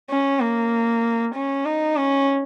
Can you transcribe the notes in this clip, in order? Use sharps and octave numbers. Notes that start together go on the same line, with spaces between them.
C#4
A#3
C#4
D#4
C#4